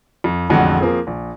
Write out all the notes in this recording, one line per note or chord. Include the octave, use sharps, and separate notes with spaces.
F2
A1 F2 D3 G#3 F#4 F#5
F3 A#3 C4 G#4
A#1